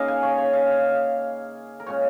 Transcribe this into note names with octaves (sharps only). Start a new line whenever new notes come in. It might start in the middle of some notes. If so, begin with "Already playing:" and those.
Already playing: C#3 A#3 D#4 G#4 A#4 D#5 F5
G#5
C#5
C#5
F5
A#4
A#2 G#3 C#4 C#5